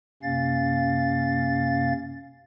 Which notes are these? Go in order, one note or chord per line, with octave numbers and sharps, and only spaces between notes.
F#2 C3 A#3 C#4 F5 A6